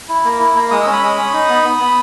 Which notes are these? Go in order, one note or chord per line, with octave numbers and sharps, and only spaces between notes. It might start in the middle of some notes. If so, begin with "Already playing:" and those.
E4
A#3
E4
A#3
G#3 D#6
C#4 E6
B5 D#6
G#3
C#4
D#4
B3
B3
B3